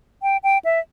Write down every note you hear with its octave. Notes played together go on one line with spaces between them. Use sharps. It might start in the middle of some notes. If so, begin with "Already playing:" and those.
G5
G5
E5